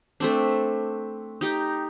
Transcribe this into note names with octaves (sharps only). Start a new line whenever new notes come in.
A3 C4 D4
D#4 G4